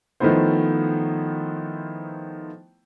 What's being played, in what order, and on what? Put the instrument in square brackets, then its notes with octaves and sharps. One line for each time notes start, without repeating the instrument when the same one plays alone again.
[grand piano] D#3 F3 A3 B3 E4 C5